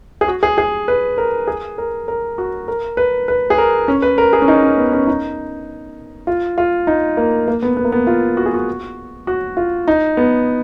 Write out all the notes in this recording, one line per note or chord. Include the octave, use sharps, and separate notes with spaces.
G#4
F#4
G#4
G#4
B4
A#4
G#4
A#4
A#4
F#4
A#4
B4
B4
G#4
A#4
C#4
B4
A#4
G#4
C#4
D#4
C#4
B3
C#4
D#4
F4
F4
D#4
A#3
A#3
B3
B3
A#3
B3
F4
F#4
G#4
F#4
F#4
F4
D#4
B3